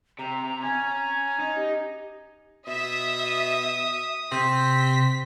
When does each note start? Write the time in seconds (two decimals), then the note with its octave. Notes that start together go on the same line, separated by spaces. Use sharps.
0.19 C3 A#5
0.64 C#4 G#5
1.40 D#4
1.56 G4
2.67 B2 E5 D#6
4.32 C3 C4 B6